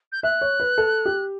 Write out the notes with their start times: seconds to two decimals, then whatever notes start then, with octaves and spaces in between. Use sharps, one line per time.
0.12 G6
0.23 E5 F#6
0.41 C#5
0.60 B4
0.78 A4
1.05 G4